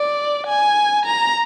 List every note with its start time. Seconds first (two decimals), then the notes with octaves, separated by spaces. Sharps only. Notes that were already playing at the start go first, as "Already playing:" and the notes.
Already playing: D5
0.47 G#5
1.06 A#5